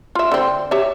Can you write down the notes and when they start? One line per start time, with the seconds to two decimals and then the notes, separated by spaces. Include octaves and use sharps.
0.15 F4 E5
0.32 D3 C4
0.71 G4 C#5 E5